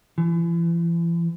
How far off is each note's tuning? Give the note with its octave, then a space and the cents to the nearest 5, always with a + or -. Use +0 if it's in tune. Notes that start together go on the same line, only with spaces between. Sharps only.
E3 +40